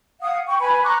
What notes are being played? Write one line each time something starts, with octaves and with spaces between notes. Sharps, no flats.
F5 F#5 D#6
G5 C#6
B4 G#5 B5
A#5 C#6 D6 F#6